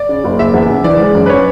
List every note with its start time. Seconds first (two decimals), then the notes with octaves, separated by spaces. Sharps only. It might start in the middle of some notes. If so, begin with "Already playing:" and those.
Already playing: D5
0.09 C#3
0.24 F#1
0.39 F#1 E5
0.54 E2
0.70 C#3
0.84 E3 D5
1.00 G#3
1.15 F#2
1.26 B4
1.30 C#4 C#5